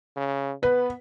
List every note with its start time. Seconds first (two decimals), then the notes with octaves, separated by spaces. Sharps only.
0.16 C#3
0.63 B3 B4